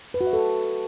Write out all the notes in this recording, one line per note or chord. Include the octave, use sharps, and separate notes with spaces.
B4
F#4
E5
A4